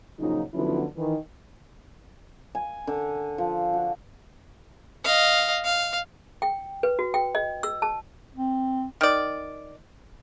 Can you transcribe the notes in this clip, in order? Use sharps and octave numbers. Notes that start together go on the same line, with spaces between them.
A#2 C#3 F3 F#3 D#4
D3 F3 F#3 B3 C#4 E4
D#3 E3
G#5
D3
F3
F#4
D#5 F5
F5
G5
B4
F#4
G5
D#5
E6
A5
C4
D#3 D5